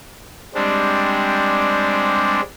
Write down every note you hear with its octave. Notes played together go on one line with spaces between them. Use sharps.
G3 G#3 C4 D4